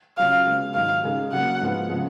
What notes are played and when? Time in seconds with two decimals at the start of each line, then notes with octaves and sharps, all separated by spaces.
0.17 C#3 F#3 C#4 F4 F5
0.46 C#3 G#3 B3
0.74 G#2 D#3 F#3 F5
1.03 C#3 G#3 D#4 G#4
1.32 C#3 F#3 A#3 F#5
1.61 G#2 F3 G#3 B3
1.90 C#3 F3 G#3